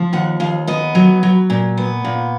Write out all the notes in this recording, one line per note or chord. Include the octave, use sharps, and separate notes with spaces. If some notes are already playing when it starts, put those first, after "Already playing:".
Already playing: F3
D#2 F#5
D#2 F5
B3 D#5
F#3
F#3
A#2
B3
A#2